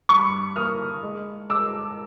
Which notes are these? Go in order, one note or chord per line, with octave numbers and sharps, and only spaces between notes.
G2 B5 C#6
A#3 D#6 F6
G#3
G#3 D6 E6